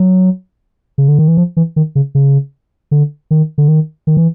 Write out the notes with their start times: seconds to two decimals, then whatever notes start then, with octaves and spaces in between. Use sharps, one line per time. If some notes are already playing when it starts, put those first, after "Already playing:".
Already playing: F#3
0.98 C#3
1.08 D3
1.19 D#3
1.28 E3
1.37 F3
1.57 E3
1.76 D#3
1.95 C#3
2.15 C#3
2.91 D3
3.31 D#3
3.58 D3
3.68 D#3
4.07 D#3
4.17 E3